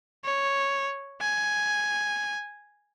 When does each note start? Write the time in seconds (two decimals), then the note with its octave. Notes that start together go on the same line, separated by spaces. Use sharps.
0.25 C#5
1.21 G#5